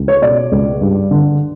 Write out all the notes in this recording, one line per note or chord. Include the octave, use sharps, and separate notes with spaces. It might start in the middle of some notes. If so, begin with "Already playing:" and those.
Already playing: C#2
C#5
B2 D5
C#2
G2
D3